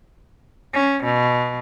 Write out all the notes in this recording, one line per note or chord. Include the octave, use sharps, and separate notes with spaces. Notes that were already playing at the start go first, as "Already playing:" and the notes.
C#4
B2